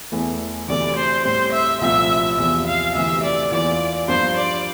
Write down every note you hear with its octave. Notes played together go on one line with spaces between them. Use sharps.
E2 E3 A3
D2 C3 E3 A3 E4 D5
C5
A2 G3 C4 C5
E5
C2 A#2 F3 A3 C4 E5
E2 C3 F3 E5
F5
D2 C3 E3 E5
D5
E2 E3 A#3 F4 D5
G2 F3 A#3 D4 F4 C5
D5